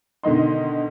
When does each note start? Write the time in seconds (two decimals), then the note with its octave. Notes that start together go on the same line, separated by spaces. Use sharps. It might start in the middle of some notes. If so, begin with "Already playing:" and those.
0.23 B2 D3 D#3 D#5 C6